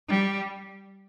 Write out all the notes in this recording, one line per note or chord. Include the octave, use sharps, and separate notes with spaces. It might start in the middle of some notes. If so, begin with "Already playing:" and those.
G3